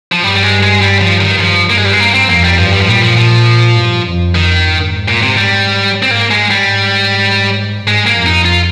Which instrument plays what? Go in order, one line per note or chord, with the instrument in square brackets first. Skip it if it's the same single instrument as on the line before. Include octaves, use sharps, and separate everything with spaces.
[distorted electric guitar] F3
[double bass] G2 [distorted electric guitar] G3
[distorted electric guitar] G3
G#3
G#3
G3
F3
D#3
[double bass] G2 [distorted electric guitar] F3
[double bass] G2 [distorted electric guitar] A#3
[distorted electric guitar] G#3
G3
G#3
[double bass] G2 [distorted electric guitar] A#3
[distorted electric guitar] C4
[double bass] F2 [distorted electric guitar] A#3
[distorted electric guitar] G3
[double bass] G2 [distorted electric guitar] F3
[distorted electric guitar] G3
F3
[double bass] A#2 [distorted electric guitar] G3
[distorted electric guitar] F3
F3
[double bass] G2
F2
[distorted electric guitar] D#3
[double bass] G#2
[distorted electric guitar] A#2
C3
G3
C4
[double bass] G#2 [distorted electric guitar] A#3
[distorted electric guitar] G#3
G3
[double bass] G#2
[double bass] G#2 [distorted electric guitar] G#3
[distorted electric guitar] A#3
[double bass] F2
[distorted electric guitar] D#4
F4